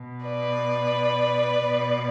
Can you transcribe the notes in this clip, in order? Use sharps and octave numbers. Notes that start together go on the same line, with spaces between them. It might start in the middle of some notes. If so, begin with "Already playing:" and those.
Already playing: B2
B4 D5
B2